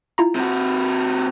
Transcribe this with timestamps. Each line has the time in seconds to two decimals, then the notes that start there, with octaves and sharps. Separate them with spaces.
0.18 E4 F4 A#5
0.35 C3 F#4